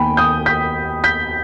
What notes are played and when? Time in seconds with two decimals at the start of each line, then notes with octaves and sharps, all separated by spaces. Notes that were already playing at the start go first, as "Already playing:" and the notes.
Already playing: D#2 D#3 B3 G5 G#5 B5
0.17 D#6 G6
0.46 G6 B6
1.04 G6 B6